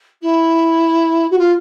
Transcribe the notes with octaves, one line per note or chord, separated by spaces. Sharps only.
E4
F#4
F4